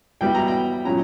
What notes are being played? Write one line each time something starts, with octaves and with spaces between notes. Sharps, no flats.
B2 G3 B3 E4 G5
A#5
G5
A#2 F#3 C#4 E4 A#5